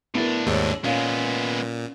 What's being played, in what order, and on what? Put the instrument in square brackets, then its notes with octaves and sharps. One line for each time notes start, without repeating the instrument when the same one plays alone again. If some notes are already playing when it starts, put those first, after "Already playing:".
[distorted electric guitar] A2 D4 [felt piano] B3 E4 A#4
[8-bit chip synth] D#2 G#2 [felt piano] C#5 E6
[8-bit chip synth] A#2 [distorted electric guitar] G#3 B3 [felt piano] C#4 F5